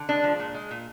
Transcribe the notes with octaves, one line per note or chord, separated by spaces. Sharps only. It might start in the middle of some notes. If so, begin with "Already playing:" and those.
Already playing: D3
G#3 D4
F3
A#2
G#3
A#2